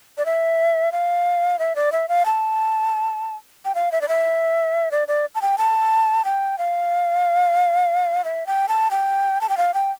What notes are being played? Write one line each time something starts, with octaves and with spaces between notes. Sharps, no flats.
D5
E5
F5
E5
D5
E5
F5
A5
G5
F5
E5
D5
E5
D5
D5
A5
G5
A5
G5
F5
E5
G5
A5
G5
A5
G5
F5
G5